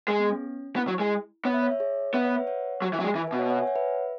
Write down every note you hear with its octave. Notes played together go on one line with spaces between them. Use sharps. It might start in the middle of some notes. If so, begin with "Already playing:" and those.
G#3 G#4
B3
C#4
B3 E4
F#3
G#3
B3 C#5
E5
C#5
E5
G#4 C#5
B3 B4 E5
C#5 F#5
B4 E5
C#5 F#5
F#3
E3
F#3
G#3
E3 E5 G#5
B4 E5
B2
C#5 F#5
C#5 F#5
E5 G#5
C#5 F#5
B4 E5